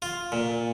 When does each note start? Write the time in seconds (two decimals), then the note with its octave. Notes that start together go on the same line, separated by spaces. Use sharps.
0.02 F4
0.32 A#2